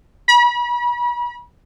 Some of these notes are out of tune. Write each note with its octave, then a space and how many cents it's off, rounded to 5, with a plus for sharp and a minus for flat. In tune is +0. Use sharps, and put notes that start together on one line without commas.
B5 -40